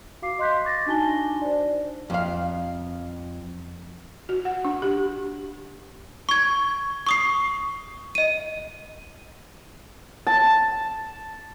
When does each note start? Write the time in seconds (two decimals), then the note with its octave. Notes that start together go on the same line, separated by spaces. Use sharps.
0.22 F#4 F5 D6 C7
0.39 D#5 C6 F#6 G6 B6
0.63 C#6 D6 A6 A#6
0.86 D4 D#4 F#4 G#5 A5 G7
1.42 C5 D5
2.10 F2 F5
4.29 F#4
4.45 F#5
4.65 D4
4.82 G4
6.29 C#6 G#6
7.07 C#6 D#6 C7
8.15 D#5 D#7
10.27 A5